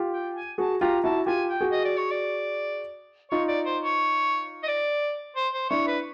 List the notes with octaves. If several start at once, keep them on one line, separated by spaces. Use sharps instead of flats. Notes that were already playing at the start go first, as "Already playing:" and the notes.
Already playing: F4 G4
G5
G#5
F#4 G#4 A5
F4 G4 A#5
E4 F#4 A5
F4 G4 G#5
G5
F#4 G#4
D#5
D5
C#5
D5
D#4 F4 C#5
D5
C5
C#5
D#5
D5
C5
C5
D4 E4 C#5
B4